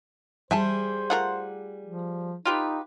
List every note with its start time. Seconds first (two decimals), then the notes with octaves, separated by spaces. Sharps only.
0.51 G3 G#4 C5 E5 G#5 A5
1.10 A3 F4 A#4 F#5
1.85 F3
2.45 D#4 F4 G4 B4